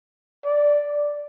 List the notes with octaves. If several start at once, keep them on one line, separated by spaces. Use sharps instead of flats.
D5